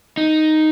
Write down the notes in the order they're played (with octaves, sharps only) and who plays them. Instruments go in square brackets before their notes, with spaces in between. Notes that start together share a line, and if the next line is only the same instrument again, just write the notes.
[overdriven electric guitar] D#4